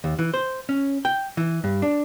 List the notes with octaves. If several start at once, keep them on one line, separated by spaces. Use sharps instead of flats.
D#2
E3
C5
C#4
G5
E3
G2
D4